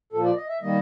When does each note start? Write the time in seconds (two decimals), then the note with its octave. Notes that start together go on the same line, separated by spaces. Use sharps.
0.13 A#2 F3 A#3 A4
0.25 D5
0.37 D#5
0.49 E5
0.62 D#3 G3 A#3 D#5